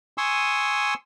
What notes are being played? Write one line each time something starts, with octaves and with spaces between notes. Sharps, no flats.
G#5 C6 C#6 D#6 E6